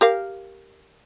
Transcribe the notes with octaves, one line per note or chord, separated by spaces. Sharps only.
G4 A#4 F5